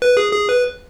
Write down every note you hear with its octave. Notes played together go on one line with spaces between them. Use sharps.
B4
G#4
G#4
B4